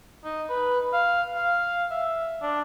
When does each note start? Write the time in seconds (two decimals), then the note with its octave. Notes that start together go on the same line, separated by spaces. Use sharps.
0.24 D#4
0.49 B4
0.93 F5
1.34 F5
1.91 E5
2.42 D4